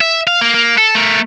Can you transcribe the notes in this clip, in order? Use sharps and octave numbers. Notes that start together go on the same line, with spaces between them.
E5
F5
A#3
A#3
A4
A3 A#4